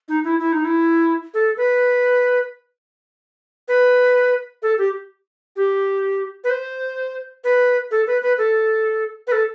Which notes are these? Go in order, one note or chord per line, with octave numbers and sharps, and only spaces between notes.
D#4
E4
E4
D#4
E4
A4
B4
B4
A4
G4
G4
B4
C5
B4
A4
B4
B4
A4
B4
A4